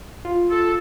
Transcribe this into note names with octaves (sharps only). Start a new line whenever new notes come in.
F4
A4